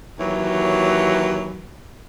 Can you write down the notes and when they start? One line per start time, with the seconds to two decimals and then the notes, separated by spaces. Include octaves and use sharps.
0.19 D#2 E3 F#3